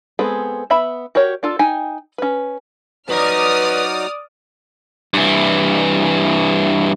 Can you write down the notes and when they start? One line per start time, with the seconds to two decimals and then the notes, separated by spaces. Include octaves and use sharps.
0.19 G#3 B3 C4 G#4 A4
0.70 B3 E5 B5
1.15 F#4 G4 A#4 C#5
1.43 D4 F4 A4
1.59 D#4 G5 G#5
2.18 C#4 B4
3.09 F#3 D#4 F#4 B4 D5 A#5 D#6 F6
5.14 G2 E3